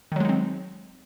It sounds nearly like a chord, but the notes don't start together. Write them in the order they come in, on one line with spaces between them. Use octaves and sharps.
D#3 F#3 G#3 D#4 C4